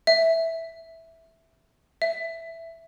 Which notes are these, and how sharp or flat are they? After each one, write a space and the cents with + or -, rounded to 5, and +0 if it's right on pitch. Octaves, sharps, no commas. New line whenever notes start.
E5 -5
E5 +5